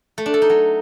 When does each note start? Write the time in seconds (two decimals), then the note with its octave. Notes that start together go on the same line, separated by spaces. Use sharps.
0.18 A3
0.26 D4
0.34 A4
0.42 D#4
0.50 F#3